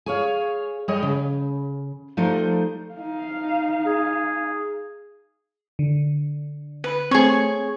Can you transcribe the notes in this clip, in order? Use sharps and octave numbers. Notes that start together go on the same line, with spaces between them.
G#4 C#5 F5
G3 G#4 C#5 D#5 G5
C#3
F3 G3 A3 D#4 C5
D#4 F5
G#4
D3
B4
A3 C4 G#4 C#5